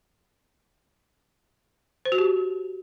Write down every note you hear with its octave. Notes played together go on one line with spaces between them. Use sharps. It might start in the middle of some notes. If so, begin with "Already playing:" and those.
C5
F#4
G4